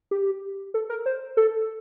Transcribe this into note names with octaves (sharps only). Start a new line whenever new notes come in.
G4
A4
A#4
C5
A4